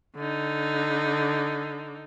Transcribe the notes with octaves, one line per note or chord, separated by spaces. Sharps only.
D3 D#4